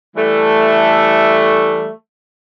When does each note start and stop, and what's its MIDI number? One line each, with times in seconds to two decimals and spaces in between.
0.17 1.90 52
0.17 1.90 55
0.17 1.90 57